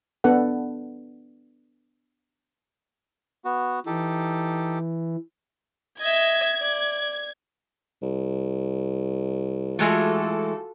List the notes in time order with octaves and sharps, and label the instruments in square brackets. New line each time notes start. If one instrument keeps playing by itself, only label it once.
[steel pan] B3 D4 A4 F#5
[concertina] B3 F#4
[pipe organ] E3 [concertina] D#4 G4 A4
[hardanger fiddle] D#5 E5 [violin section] G#6
[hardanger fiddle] D5
[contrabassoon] C2
[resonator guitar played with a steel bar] E3 G#3 A3 [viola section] F4 F#4 A4